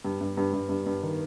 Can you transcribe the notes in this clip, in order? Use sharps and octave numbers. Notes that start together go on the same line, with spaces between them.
G2
G2
G2
G2
G2
G2
D#3